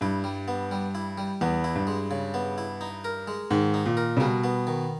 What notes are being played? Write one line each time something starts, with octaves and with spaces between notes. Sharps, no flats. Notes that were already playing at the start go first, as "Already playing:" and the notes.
G2 E4
G3
B3
G3
E4
G3
E2 B3
E4
G2
G#3
C#3
B3
E4
D#4
A#4
G#3
G#2 D#3
D#4
A#2
A#4
C#3
B2 G3
B3
D#3